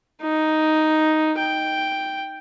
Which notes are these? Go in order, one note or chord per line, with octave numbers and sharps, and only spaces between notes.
D#4
G5